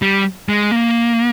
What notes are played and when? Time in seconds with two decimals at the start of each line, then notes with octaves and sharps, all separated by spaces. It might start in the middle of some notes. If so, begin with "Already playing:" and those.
0.02 G3
0.49 G#3
0.71 A#3